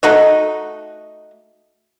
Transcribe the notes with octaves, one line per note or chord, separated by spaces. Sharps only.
A3 D#4 F#4 D#5